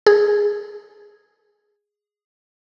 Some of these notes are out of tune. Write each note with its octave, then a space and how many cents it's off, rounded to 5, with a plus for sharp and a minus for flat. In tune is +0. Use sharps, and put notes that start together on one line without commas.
G#4 -5